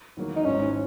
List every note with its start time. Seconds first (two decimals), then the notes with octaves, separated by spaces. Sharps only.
0.17 E1 E2 D#3 F#3 A#3
0.36 D#4
0.45 G#1 G#2 E3 C#4